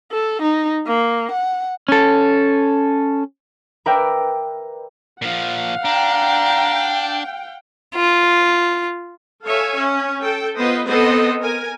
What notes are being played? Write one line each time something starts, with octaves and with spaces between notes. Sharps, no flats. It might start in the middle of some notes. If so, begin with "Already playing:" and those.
A4
D#4
A#3
F#5
C#4 A4
A#4 B4 D5 E5 G5
A#2 F3 F5 F#5
D4 G5 A#5
F4
A4 C#5 E5 F5 G#5
C#4
A4 G5
B3 F4 B4 C5 D#5
B3 C4 A4 C5 D#5
A#4 G#5